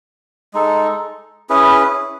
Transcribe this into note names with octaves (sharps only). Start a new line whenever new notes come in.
G#3 D#4 A4
C#4 E4 G#4 B4